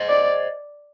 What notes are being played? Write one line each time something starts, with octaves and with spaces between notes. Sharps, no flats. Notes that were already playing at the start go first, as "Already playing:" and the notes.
Already playing: C5 D#5
D5